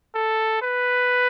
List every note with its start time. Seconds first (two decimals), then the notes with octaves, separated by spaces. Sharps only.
0.15 A4
0.62 B4